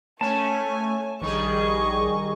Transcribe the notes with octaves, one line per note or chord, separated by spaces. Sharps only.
A3 C#4 C#5 G#5 A5
A#1 D#3 G3 G#4 D#5 C#6